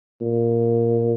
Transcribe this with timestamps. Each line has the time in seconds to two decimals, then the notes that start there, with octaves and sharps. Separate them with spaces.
0.21 A#2